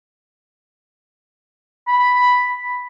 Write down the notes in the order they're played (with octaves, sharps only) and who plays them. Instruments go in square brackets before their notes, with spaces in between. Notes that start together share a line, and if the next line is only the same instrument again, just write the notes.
[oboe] B5